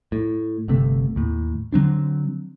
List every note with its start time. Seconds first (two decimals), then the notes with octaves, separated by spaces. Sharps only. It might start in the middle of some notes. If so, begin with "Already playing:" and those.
0.12 A2
0.68 G1 C3 A3
1.16 D#2 A2
1.72 D3 F#3 C4 D4